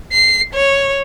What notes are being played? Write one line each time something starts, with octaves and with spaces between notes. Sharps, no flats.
C7
C#5